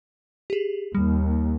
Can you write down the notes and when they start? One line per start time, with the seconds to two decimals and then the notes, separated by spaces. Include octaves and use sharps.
0.50 G4 G#4
0.95 D#2 D#3 G3